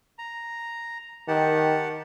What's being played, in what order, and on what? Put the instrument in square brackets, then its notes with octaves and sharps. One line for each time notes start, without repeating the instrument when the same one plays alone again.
[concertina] A#5
[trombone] D#3 [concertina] G4 F#5 A5